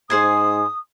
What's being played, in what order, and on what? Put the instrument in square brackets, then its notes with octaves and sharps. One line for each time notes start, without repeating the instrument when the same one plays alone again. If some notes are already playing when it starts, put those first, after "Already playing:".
[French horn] G#2 [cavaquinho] G#4 C5 G#5 [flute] D#6